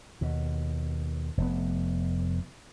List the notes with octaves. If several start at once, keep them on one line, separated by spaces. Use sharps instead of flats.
D#2 B2
F1 B3